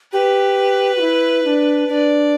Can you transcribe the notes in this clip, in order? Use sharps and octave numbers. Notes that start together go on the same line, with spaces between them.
G4 B4
F#4
E4
D4
D4 D5